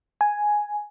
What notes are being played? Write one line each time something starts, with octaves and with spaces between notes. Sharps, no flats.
G#5